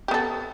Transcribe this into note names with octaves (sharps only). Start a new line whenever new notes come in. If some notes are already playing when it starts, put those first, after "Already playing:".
B3 G4 A4